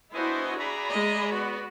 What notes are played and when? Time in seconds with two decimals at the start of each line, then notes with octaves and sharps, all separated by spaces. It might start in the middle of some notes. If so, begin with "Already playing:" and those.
0.14 B3 D4 E4 F#4 C5 D#5 G#5
0.59 G#4 D5 E5 A#5 B5
0.90 G#3 D#5
1.32 B3 F#4